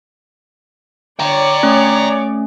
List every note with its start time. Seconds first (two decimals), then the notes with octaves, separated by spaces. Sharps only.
1.19 C#5 D5 G5 A#5
1.63 A3 C#4